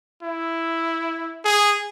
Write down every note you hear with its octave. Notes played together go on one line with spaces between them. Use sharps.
E4
G#4